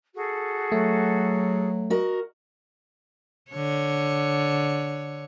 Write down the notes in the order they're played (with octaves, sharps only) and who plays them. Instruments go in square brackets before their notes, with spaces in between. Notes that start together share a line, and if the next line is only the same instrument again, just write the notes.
[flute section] F#4 G#4 A4
[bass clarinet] F#3 [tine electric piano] A3
[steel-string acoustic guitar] F#4 A#4 D#5
[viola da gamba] D3 C#5